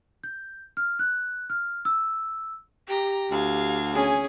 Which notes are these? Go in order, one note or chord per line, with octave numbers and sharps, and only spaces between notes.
G6
F6
F#6
F6
E6
G4 G5 A#5
D2 F5 G#6
C#4 G#4